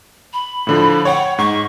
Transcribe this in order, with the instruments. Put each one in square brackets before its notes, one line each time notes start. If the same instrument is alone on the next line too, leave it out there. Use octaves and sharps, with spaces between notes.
[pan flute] B5
[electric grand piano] A2 D3 F3
[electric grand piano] C#5 G5 [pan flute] F#5
[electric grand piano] G#2 [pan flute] C#6